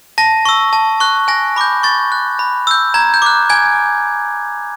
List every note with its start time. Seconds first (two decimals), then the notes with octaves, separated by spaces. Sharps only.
0.18 A5 A#6
0.45 C#6 E6
0.73 A5
1.00 C#6 F#6
1.28 G#5 A#6
1.56 B5 D6 G6
1.83 C#6 A6
2.12 F#6
2.39 B5
2.67 E6 G6
2.94 A#5 G#6
3.14 G6
3.22 D6 F#6
3.50 G#5 G#6